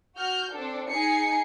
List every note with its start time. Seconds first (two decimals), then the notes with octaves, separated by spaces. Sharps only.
0.18 F#4 F6 G6
0.51 C4 D4 A4
0.89 D#4 G#4 G#5 C7 C#7